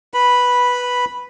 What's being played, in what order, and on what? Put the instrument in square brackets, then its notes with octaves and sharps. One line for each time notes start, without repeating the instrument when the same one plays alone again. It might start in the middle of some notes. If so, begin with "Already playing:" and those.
[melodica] B4 B5